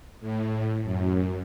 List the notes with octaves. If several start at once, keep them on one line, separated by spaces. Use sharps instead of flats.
A2
F#2